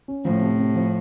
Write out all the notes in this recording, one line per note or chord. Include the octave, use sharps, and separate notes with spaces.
C#4
A2 F3
C3
C3
F3